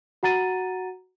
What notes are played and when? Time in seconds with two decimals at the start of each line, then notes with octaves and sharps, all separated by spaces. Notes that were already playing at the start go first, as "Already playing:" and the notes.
0.23 F#4 F#5 A#5 A6 D#7